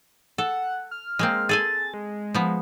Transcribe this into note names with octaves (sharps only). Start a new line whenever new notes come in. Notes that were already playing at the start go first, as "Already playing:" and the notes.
A4 F#5
F6
G#3 A#3 C4
G#4 A4 G#5 A6
G#3
F3 B3